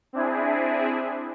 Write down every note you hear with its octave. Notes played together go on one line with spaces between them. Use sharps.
C4 D4 E4 G#4